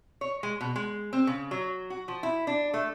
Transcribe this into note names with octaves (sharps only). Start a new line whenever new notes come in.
C#5
G#3
B2
G#3
C4
C#3
F#3
F#4
F3
E4
D4
A3